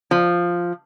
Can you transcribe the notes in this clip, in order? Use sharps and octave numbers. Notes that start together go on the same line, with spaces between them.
F3